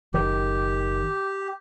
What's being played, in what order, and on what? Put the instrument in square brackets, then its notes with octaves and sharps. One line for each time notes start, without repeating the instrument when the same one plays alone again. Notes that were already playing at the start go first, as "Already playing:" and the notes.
[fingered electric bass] F#1 D#3 [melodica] G4